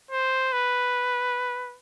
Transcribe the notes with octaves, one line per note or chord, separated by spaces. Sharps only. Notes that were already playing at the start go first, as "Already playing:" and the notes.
C5
B4